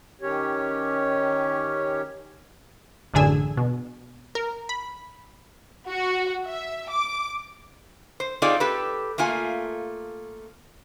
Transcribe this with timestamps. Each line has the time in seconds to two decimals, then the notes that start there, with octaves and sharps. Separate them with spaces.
0.22 D#3 C#4 G4 C#5
3.14 A1 F#2 D3 G#4 G#5 E6
3.57 B2
4.35 A#4
4.69 B5
5.89 F#4
6.46 E5
6.91 D6
8.20 C5
8.42 C4 D#4 F4 G#4 A4 D5
8.60 G4 A4 B4
9.18 A3 A#3 F4 G#5